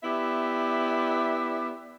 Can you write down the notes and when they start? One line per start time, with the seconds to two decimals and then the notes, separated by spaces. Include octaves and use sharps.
0.03 B3 E4 G4 D5 E5